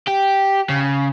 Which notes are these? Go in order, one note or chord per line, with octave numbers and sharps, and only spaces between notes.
G4
C#3